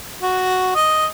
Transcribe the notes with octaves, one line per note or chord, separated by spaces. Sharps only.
F#4
D#5